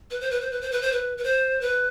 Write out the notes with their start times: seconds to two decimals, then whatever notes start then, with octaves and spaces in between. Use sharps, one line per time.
0.11 B4
0.21 C5
0.31 B4
0.41 C5
0.51 B4
0.61 C5
0.72 B4
0.82 C5
0.92 B4
1.18 B4
1.24 C5
1.61 B4